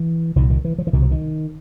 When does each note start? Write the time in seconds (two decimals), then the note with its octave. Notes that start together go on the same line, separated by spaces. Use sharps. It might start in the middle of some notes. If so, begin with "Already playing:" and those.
Already playing: E3
0.36 C2 A#2 D#3
0.50 D#3
0.65 E3
0.78 F3
0.87 E3
0.93 C2 B2 D#3
1.02 F3
1.11 D#3